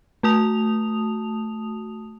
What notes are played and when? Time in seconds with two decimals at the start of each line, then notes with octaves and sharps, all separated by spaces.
0.23 A3 F#4 A5 D#6 F7